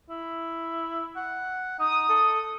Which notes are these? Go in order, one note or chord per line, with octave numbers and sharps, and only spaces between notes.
E4
F#5
D#4 D#6
A4